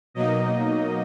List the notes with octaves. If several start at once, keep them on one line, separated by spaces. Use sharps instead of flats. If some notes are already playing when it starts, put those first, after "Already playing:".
B2 F#3 A#3 D#4 D#5